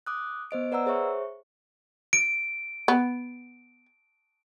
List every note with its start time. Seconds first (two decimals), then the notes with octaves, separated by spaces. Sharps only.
0.07 D6 D#6 F#6
0.51 B3 C5 D#5 D7
0.72 B4 D5 F#5 A#5 E6
0.86 G#4 C5 C#5 E5 C#6
2.13 D7
2.88 B3